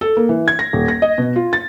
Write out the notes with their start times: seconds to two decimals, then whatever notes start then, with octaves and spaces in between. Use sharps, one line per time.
0.01 A4
0.17 A#3
0.29 E3
0.48 G#6
0.59 A#6
0.73 D#1
0.88 A#6
1.02 D#5
1.18 B2
1.36 F4
1.53 A6